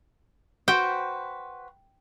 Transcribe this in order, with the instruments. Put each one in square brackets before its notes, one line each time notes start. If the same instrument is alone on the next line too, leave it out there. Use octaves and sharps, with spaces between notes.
[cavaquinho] F#4 B4 C5 [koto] G5